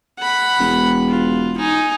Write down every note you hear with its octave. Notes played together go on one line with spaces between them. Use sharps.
F#5 B5
E1
F4
D#4 G#5